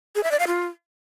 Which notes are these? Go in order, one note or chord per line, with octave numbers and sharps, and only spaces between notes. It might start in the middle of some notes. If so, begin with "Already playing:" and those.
G#4
E5
D5
F5
F4